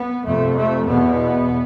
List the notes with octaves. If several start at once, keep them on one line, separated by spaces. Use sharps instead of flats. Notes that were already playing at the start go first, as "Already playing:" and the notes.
Already playing: B3
F2 C3 A3
A3
E2 B2 B3